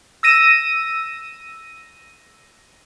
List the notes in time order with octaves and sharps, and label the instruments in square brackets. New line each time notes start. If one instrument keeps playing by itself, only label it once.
[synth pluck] E6 A#6 D#7 E7